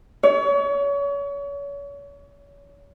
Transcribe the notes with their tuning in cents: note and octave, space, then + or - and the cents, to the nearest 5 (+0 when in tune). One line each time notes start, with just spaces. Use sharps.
C#5 +35